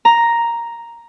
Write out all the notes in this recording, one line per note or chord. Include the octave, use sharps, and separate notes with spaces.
A#5